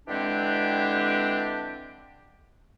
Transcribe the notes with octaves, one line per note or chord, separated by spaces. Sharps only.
D3 E3 G#3 C4 D4 G4